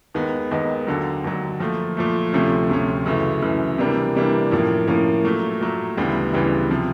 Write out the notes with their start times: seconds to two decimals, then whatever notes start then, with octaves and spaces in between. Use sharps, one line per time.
0.15 D#2 D#3 G#3 B3
0.51 D#2 D#3 G#3 B3
0.87 D#2 D3 F#3
1.24 D#2 D3 F#3
1.59 A#2 F3 A3
1.97 A#2 F3 A3
2.33 D2 C3 F3 A3 C#4
2.69 D2 C3 F3 A3 C#4
3.06 F#2 C#3 E3 A3
3.42 F#2 C#3 E3 A3
3.78 C3 E3 G3 A#3 D4
4.15 C3 E3 G3 A#3 D4
4.51 A2 F3 A#3 C#4
4.88 A2 F3 A#3 C#4
5.24 A#2 F#3 A3
5.61 A#2 F#3 A3
5.97 D2 C#3 E3 G3 B3
6.33 D2 C#3 E3 G3 B3
6.71 C3 F3